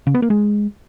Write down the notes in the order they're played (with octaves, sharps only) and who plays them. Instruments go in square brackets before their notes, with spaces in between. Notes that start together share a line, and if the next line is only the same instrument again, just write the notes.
[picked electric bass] C#3
B3
A#3
G#3